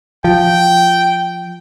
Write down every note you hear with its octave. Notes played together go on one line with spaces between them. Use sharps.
F3 G5